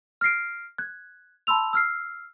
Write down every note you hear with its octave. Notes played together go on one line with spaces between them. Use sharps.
F6 A#6 C7 D7
F#6 G#6
A5 B5 C6 E6 F7
E6 F6 C7